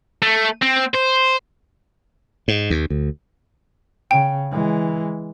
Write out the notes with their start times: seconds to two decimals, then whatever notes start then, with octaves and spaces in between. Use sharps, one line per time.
0.22 A3
0.62 C4
0.95 C5
2.48 G#2
2.70 D#2
2.90 D2
4.11 C#3 G5
4.51 E3 G#3